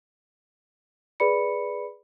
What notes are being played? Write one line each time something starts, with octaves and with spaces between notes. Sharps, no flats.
G#4 B4 D5 B5 C#7